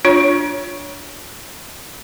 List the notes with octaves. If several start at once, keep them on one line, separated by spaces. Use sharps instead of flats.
D4 F4 C#5